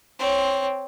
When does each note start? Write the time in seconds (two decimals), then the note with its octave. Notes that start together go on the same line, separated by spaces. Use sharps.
0.19 C4 C#5